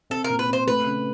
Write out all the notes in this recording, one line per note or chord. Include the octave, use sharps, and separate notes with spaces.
C4 A4
A#4
A#2
B4
C4 C5
A3 B4
C#3